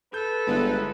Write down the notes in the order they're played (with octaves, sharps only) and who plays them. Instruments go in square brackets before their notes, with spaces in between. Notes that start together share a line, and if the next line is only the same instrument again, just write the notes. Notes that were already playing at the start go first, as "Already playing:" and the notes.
[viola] A4 [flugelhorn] B4 [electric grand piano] G6
[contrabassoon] G1 [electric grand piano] G#3 B3 E4